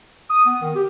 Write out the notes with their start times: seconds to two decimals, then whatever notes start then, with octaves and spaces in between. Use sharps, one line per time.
0.30 D#6
0.45 B3
0.62 D#3
0.75 G4